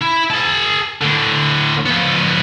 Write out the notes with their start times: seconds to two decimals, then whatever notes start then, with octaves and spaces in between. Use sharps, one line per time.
0.01 E4
0.30 G#4 A5
1.01 A2 D3
1.86 F3 B3